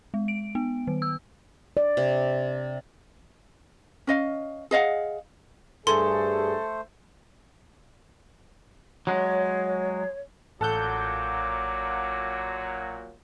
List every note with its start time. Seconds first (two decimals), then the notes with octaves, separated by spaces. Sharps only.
0.14 G#3
0.28 D7
0.55 B3
0.87 D#3
1.02 E6
1.77 D5
1.97 C3
4.07 C#4 D#5 F5
4.71 G#4 D#5 F5 F#5
5.87 G2 A3 G#4 A4 C5 C6
9.07 F#3 G#3 C#5
10.61 A1 A#2 F#3 A4 F#5 D6 G6